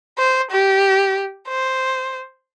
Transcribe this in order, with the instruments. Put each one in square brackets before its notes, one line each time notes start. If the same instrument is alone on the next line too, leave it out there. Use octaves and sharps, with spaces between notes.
[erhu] C5
G4
C5